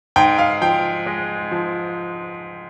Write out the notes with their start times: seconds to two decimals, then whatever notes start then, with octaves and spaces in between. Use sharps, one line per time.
0.16 G#2 G5
0.38 F5
0.62 F3 G5
1.06 G#3
1.51 F3